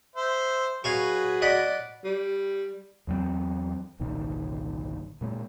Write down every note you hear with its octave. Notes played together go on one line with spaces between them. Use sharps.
C5 E5
F#3 F#4 G#4 B4 F5 G#5 C#6
D5 D#5 F#5 B5
G3
E2 F#3 A3 C4
G1 C2 A#2 D#3
A#2 G#3 A#3